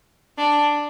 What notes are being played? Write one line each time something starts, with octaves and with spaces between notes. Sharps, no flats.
D4